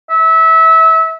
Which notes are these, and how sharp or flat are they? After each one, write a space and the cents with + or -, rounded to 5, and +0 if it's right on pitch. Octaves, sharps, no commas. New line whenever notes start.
E5 -25